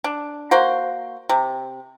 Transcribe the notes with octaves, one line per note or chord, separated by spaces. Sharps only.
D4
A#3 F#4 C5
C3